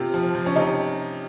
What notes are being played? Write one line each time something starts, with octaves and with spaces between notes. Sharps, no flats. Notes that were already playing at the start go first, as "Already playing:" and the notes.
Already playing: C3 F4
F3
F3
C#4
C3 D#4